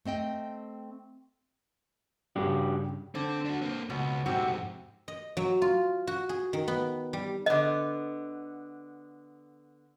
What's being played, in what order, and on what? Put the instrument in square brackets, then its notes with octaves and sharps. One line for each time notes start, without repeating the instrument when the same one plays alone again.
[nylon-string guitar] A3 C4 D#5 G5
[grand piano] G2 C#3 [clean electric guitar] D4 F#4 G4
[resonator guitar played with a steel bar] D3 [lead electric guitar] C4
[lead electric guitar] D4 F#4
A#3 C4
[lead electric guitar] C#2 [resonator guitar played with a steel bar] B2
[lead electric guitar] F2 G#2 [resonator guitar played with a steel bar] C3 C4 F#4
[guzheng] D#5
F#3
F4
F#4
G#4
D#3
B3
G3
[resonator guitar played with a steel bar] D3 B3 [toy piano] D#5